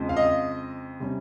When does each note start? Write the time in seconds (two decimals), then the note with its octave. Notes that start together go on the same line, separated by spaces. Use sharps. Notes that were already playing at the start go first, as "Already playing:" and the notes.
Already playing: F2 C#3 F3 G#3
0.09 F5
0.17 D#5
1.00 C3 G3 C#4